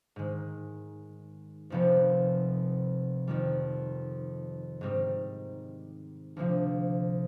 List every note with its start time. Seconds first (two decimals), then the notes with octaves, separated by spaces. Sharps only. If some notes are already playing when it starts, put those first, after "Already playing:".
0.16 G#2 D#3 G#3
1.70 F1 F2 C3 F3 B3
3.27 F2 D#3 G3
4.81 G#2 D#3 G3 C4 D#4
6.37 D2 C3 F3